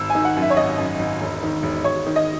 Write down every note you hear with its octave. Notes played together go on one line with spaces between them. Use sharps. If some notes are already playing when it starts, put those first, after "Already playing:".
Already playing: G#1 E6
G#5
D#3
F#5
F#2
E5
C#5
G#1 D#5
F#2
G#1
E1
D#3
E1
E1 C#5
D#3
D#5